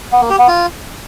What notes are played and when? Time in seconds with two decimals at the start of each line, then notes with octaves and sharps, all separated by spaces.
0.12 B3
0.21 A#3
0.30 G4
0.39 B3
0.48 F4